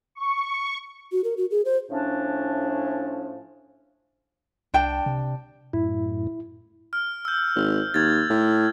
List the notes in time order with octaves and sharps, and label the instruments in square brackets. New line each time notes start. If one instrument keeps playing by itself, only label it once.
[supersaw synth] C#6
[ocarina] F#4
A#4
F#4
G#4
C5
[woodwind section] A2 F3 C#4 D4
[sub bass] C2 [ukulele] D4 G5 A5
[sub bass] C3
[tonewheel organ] F#2 A2 [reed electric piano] E4
[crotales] F6
E6 G6
[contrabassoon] G#1
[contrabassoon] D#2 [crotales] G#6 A6
[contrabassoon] A2